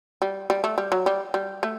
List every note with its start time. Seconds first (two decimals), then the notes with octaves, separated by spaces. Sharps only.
0.22 G3
0.50 G3
0.64 A3
0.78 G3
0.92 F#3
1.06 G3
1.34 G3
1.63 A3